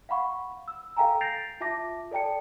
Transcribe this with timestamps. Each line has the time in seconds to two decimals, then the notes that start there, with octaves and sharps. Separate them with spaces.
0.09 F5 F#5 B5 C#6
0.68 E6
0.97 A4 F5 G5 G#5 A#5
1.21 G6 A6 A#6 C7 D7 F7
1.61 F4 E5 A5 D6 A#6
2.11 A4 D5 G5 A5 C#7